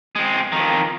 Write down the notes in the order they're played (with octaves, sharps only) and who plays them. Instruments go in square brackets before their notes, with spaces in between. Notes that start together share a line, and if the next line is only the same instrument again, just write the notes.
[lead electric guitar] G#3 C4
F2 D#3